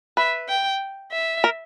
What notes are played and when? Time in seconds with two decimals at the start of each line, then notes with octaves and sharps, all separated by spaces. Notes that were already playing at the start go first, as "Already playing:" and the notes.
0.17 B4 E5
0.49 G5
1.12 E5
1.44 A#4